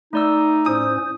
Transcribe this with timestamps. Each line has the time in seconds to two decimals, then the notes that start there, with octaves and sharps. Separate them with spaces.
0.13 A3 D#4 D5 E6
0.66 A2 C#4 C5 D#6